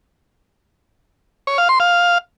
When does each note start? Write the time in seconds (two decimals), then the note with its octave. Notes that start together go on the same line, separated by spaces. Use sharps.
1.47 C#5
1.58 F5
1.69 C6
1.80 F5